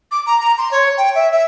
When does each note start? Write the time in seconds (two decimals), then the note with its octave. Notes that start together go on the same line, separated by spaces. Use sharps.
0.11 D6
0.26 A#5
0.40 A#5
0.58 C6
0.71 C#5
0.97 G5
1.15 E5
1.32 E5